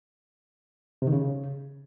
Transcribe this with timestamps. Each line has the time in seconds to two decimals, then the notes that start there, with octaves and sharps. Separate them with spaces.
1.02 C3
1.07 D#3
1.12 C#3